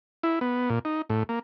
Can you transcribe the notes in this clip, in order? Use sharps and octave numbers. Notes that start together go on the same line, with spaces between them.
E4
B3
A#2
D#4
A2
A#3